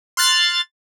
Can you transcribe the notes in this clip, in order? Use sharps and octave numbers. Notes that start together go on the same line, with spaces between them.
C6 F6 F#6 A6 C7